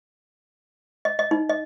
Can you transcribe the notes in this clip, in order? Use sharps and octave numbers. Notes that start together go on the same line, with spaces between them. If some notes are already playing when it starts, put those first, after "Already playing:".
D#5
D#5
D#4
D#5